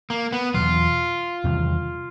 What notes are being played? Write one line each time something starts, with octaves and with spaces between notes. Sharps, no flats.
A#3
B3
E2 B2 F#3 F4
E2 C3 D#3 G3